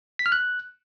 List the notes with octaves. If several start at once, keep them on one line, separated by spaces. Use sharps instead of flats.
B6
F6
F#6